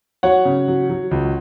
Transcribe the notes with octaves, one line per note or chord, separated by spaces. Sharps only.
F#3 C#5 F#5
C#3
F#3
F#3
C#2